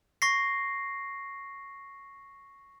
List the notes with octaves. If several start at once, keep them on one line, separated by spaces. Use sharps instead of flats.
C#6 A#6 C7